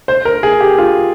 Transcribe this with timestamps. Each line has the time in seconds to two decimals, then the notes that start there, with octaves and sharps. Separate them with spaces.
0.08 C5
0.25 A#4
0.43 G#4
0.60 G4
0.78 F4